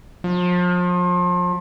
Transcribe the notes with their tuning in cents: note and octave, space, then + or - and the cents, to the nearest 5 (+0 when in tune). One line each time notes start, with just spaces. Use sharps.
F3 +35